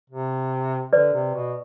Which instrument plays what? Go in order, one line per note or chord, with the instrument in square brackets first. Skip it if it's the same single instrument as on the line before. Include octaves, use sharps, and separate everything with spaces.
[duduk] C3
[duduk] D3 [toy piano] B4 D5
[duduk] C3
B2